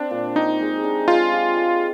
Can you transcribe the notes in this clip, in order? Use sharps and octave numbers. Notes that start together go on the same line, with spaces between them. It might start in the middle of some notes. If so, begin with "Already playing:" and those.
Already playing: C4 D4
A#2
D#4 G4
G#3
D4
G#3 F4
G4
G#3